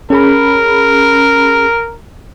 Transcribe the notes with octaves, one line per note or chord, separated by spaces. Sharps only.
C#4 G#4 A#4 B5